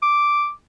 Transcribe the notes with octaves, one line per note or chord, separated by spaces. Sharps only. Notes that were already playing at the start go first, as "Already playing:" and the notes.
D6